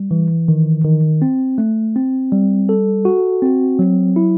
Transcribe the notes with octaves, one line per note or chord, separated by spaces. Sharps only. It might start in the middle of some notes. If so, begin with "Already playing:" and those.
Already playing: G3
E3
D#3
D#3
C4
A3
C4
G3
A4
F#4
C4
F#3
E4